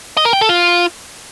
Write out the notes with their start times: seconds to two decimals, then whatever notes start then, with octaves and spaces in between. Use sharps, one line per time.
0.17 D#5
0.25 A#4
0.33 G5
0.41 A4
0.49 F4